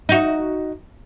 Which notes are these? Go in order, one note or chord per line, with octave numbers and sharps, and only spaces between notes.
D#4 F#4